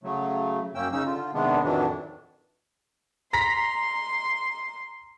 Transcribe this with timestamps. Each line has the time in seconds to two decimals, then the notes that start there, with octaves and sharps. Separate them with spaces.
0.04 C#3 F#3 A3
0.75 F#2 A#3 C#4 G5 E6
0.92 C#3 C#4 D#4 E6
1.06 D3 F4
1.34 C3 D#3 G#3 B3 D4
1.63 F2 A2 D#3 E3 F#3 D4
3.33 A#5 C6 A#6 B6